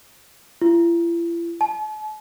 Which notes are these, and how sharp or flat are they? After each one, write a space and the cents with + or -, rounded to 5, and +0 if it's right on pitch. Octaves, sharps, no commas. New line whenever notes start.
E4 +45
A5 -45